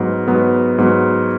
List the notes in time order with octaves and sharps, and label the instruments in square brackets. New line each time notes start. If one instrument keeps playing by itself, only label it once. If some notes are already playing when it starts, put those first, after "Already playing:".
Already playing: [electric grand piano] G#2 F#3 B3
G#2 F#3 B3
G#2 F#3 B3